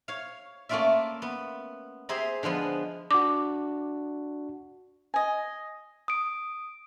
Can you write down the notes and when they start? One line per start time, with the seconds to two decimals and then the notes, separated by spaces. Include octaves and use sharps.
0.08 C#5 F5
0.69 A3 A#3 C#4 F4 D5 E5
1.22 B3
2.09 G4 G#4 C5 E5 A#5 B5
2.43 D3 F3 G#3 B3
3.11 D4 F#4 D6
5.14 D#5 G#5
6.08 D#6 D7